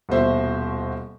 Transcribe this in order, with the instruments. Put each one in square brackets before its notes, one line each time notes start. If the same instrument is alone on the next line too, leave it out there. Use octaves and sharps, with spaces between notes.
[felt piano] D#1 B2 C5 E5